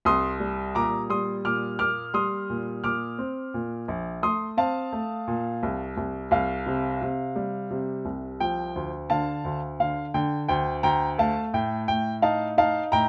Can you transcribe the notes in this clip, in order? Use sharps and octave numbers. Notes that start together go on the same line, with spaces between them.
C2 C6 D#6
G3
A#2 A#5 D6
G3 C6 D#6
A#2 D6 F6
A#3 D6 F6
G3 C6 D#6
A#2
A#2 D6 F6
C4
A#2
A#1
A3 C6 D#6
C4 F5 A5
A3
A#2
C2
C2
C2 F5
C3
C3
G3
C3
C2
F3 G5
D2
D3 F5 A5
D2
D3 F5
D3 G5
D2 G5
D2 G5 A#5
A3 F5 A5
A2 G5
A2 G5
D#4 F5 A5
D#4 F5 A5
A2 G5 A#5